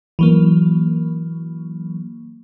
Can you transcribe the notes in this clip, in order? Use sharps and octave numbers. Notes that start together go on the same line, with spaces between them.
E3 F#3 A#3